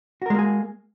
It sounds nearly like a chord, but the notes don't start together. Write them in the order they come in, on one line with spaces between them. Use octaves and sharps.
F#4 A#4 G#3 A#3 G#4